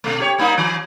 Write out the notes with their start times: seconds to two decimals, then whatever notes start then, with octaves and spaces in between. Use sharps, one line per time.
0.04 B2 A3
0.20 G4 C#5
0.38 G3 A#3 D#4
0.58 E3